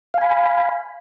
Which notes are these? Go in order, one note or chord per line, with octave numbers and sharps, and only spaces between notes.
F5 G#5 B5